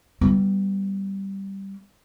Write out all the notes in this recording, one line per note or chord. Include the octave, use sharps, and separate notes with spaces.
G3 B3